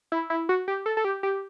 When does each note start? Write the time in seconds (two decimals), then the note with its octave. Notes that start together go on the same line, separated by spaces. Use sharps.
0.12 E4
0.30 E4
0.49 F#4
0.68 G4
0.86 A4
0.97 A4
1.04 G4
1.23 G4